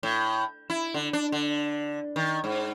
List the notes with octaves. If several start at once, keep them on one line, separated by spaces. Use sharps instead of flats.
A2
E4
D3
D4
D3
D#3
G#2